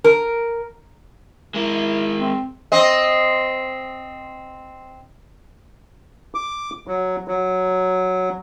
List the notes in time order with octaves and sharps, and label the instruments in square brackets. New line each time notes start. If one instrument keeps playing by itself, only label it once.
[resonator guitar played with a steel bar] A#4
[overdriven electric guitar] G#3 A#4 [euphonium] E4
[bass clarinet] C4
[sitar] C4 D#5
[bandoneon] D6
F#3
F#3